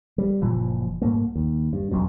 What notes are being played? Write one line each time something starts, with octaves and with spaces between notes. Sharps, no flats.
G3
F#1 A#2 E3 F3
C2 G#2 A3 A#3
D#2
G2
E1 B1 F#2 B2